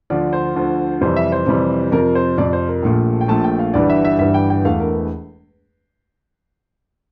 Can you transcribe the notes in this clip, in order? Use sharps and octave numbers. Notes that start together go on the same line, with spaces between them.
D2 D3 F3 D5
C5
D2 D3 F3
F2 C3 E3 G3 C5
E5
C5
F2 C3 E3 G3
F2 C3 F3 A#4
C5
F2 C3 F3 D5
C5
A#4
A#1 A#2 F3 A3
G5
A#1 A#2 F3 A3 A5
G5
F5
G1 G2 E3 G3 D5
E5
E5
G1 G2 E3 G3 E5
G5
G5
E1 E2 E3 A3 F5
A#4